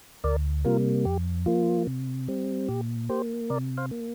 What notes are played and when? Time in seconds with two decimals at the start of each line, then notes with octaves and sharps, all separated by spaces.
0.24 D2 A#4 D5
0.65 C3 G3 A#3 F4 A#4
1.05 F2 G4
1.46 F3 A#3 F4
1.87 C3
2.28 G3 C4
2.69 A#2 G4
3.09 A#3 G4 C5
3.50 C3 A#4 D5
3.78 C5 F5
3.91 A#3